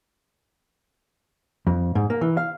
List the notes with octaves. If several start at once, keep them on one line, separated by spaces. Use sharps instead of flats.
F2
G#2
A#3
E3
F5